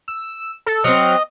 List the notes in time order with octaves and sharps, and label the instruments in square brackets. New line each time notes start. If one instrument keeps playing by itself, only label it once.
[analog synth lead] E6
A4
[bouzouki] F#3 C4 [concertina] D#5 [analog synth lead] F6